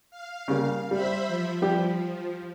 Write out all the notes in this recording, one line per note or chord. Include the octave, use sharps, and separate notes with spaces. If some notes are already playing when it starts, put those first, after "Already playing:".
F5
C#3 G3 A#3
G3 C5 E5 B5
F3
G3 G4